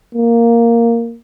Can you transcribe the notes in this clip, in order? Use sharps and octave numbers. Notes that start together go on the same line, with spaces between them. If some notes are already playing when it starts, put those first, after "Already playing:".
A#3